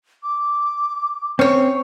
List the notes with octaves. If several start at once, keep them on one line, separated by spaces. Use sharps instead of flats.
D6
C4 C#4 C#5